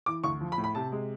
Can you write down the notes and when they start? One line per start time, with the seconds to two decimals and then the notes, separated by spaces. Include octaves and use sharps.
0.06 E3 D6
0.24 D2 C#6
0.41 F3
0.52 B5
0.58 A2
0.64 B5
0.75 C3 A5
0.92 G#3